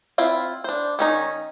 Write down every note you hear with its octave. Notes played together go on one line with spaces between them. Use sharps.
C4 E4 F4 F5
D4 C5
D#3 C#4 D#4